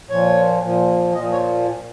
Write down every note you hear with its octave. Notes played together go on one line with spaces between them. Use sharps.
A#2 F3 C#5
A#2 F3
A#2 F3 D#5
C#5